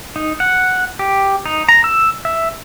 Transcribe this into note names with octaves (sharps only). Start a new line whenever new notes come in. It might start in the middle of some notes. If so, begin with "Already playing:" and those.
D#4
F#5
G4
D#4
A#5
E6
E5